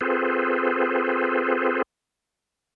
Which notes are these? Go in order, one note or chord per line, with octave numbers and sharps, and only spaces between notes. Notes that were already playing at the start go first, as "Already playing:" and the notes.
C4 F4 G#4 A4 B4 C5